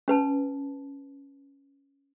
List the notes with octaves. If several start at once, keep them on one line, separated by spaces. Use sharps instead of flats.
C#4 B4 A5